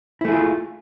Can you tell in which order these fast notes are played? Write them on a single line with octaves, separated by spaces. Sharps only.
E4 A3 G#4 F4